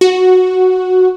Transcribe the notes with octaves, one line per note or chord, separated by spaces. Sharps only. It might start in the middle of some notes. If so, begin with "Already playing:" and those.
F#4